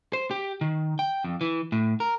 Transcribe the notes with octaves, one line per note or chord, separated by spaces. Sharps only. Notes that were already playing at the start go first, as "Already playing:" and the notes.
C5
G4
D#3
G5
F2
E3
A2
A#4